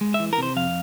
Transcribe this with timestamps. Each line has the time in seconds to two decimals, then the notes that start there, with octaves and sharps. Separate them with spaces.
0.01 G#3
0.14 E5
0.20 E3
0.33 A#4
0.38 C3 C5
0.56 F2 F5